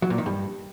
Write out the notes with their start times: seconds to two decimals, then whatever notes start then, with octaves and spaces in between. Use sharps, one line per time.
0.02 F#3
0.10 A#2
0.18 D#3
0.26 G2